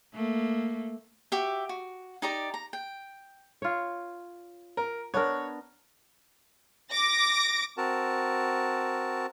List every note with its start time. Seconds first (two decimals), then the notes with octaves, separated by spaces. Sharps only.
0.14 A3 A#3
1.32 F#4 G4 E5
1.69 F#4
2.22 D#4 G4 D5 A#5
2.54 A#5
2.73 G5
3.62 F4 C#5
4.77 A#4
5.14 B3 D4 A#4 C#5
6.92 D6 A#6
7.77 C4 F#4 A#4 A5